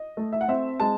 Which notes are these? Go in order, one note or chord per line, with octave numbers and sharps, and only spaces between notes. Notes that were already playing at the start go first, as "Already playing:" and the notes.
Already playing: D#5
A3
E5
F#5
C4 E5
G#3 A5